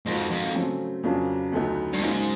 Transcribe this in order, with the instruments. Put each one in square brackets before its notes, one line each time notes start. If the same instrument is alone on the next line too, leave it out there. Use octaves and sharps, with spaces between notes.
[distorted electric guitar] F2 [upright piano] G#2 F3 A#3 D#4 F#4
[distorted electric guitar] F2
[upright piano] C#3 F#3 A3 C4
F2 C#3 F#3 A#3 D4
D2 D3 F#3 B3 D#4
[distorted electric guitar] G2
[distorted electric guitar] G#2 [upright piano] C#3 F#3 A#3 D#4